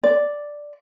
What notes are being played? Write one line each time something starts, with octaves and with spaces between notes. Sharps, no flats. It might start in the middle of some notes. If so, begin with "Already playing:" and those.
D5